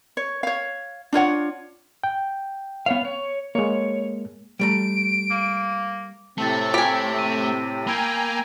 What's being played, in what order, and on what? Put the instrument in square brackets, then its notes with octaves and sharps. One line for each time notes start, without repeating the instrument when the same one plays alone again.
[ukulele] C#5
C#5 F5
D4 F4 C#5 F#5
[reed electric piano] G5
[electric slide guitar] B3 C#5 F5
C#5
[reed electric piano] G#3 A#3 [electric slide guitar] C#5
[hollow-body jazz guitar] G3 A3 A#5 [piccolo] D7
[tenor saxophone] A#3
[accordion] A2 C3 C4 [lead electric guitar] A3 [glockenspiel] A5 A6
[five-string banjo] G4 G#5 [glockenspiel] D6 B6 D7
[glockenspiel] D#7
[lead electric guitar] A#3 [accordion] G5 G#5 A#5 [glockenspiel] B5 E6 D7